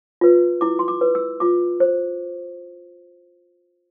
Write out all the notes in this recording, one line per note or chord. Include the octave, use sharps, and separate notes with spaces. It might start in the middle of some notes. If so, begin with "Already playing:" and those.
F4 B4
E4 D6
C6
D6
B4
E6
F4 D6
C5